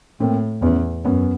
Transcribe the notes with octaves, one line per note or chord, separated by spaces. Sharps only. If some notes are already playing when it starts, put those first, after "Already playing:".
A2 A#3 C4
E2 B3 C#4
F#2 B3 C#4